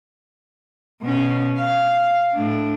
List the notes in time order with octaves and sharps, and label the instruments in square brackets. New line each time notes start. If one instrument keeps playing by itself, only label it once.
[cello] B2 C#4
F5
A2 D4